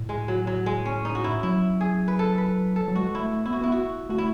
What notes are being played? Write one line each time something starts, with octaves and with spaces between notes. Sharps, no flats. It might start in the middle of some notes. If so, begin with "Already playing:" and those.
Already playing: A2
G#3
F#3
F#3
G#3
C#4
D#4
F#4
E4
F#3 E4
G#4
B4
A4
B4
A4
F#3
G#3 F#4
E4
A3
B3 E4
F#4
B3 E4
F#4
A3 F#4
E4